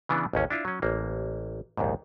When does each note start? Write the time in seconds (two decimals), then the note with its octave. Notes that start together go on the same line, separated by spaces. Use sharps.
0.09 C#3 E3 B3 D4
0.33 A1 D#2 C#4
0.50 D4 E4 F4
0.65 F#3 C#4
0.82 A1 A#3
1.77 A#1 D#2 G#2